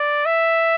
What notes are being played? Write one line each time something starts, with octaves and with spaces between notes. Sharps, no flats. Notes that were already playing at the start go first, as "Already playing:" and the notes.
Already playing: D5
E5